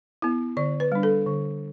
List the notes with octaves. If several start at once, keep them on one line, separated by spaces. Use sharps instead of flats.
B3 E4
D3 D5
B4
G3 D4
A4
D3